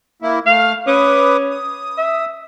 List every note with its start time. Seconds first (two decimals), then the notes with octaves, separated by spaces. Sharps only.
0.22 A#3 E4
0.46 A3 F5 F6
0.87 C#4 B4 D6 D#6
1.51 D#6
1.98 E5